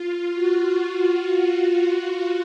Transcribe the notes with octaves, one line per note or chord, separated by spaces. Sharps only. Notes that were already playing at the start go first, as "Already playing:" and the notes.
Already playing: F4
F#4